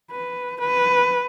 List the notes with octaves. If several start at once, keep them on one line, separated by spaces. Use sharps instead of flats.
B4
B4